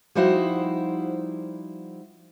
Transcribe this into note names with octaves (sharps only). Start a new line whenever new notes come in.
F3 G3 D#4 E4 F#4 C5